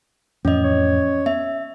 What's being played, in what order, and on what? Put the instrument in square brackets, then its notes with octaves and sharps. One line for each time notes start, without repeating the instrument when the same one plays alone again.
[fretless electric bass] F2 A2 E3 [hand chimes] C#4 D#5
[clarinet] C#5
[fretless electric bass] B3 [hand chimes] E5